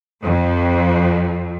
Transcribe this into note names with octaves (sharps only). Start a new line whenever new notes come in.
F2